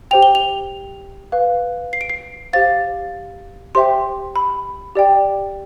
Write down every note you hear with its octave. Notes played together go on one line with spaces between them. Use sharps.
G4 C5 G5 F7
G7
F7
B4 F5
C7
D7
C7
G4 C5 F5 A6
G4 C5 E5 G5 C6
B5
G4 D5 G5